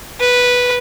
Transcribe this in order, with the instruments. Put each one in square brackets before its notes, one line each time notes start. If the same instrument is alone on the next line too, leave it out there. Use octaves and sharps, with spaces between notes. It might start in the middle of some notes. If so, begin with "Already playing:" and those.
[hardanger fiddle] B4